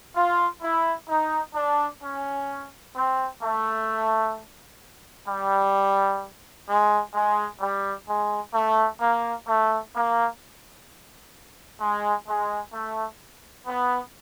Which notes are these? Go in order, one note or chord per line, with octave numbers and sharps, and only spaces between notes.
F4
E4
D#4
D4
C#4
C4
A3
G3
G#3
G#3
G3
G#3
A3
A#3
A3
A#3
G#3
G#3
A3
B3